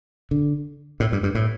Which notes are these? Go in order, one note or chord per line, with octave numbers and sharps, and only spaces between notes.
D3
A2
G2
G2
A2